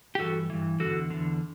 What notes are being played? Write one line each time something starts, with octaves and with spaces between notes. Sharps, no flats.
G4
G2 E3 F#4 A4
G2 E3
E2 D3 F#4 A4
E2 D3